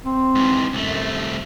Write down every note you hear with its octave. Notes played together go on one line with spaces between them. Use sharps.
C4
G#2 E3
C2 F#2 A3